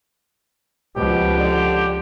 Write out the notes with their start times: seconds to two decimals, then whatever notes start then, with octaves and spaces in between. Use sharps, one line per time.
0.96 C#2 B2 F3 G4
1.37 D3